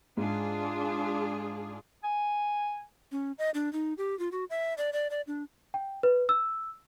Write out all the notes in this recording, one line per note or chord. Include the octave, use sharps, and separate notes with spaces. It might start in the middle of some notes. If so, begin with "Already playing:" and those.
G#2 D4 F4 G#4
G#5
C#4
D#5
D4
D#4
G4
F4
F#4
E5
D5
D5
D5
D4
G5
B4
E6